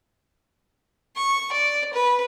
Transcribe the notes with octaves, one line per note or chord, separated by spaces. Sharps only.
C#6
D5
B4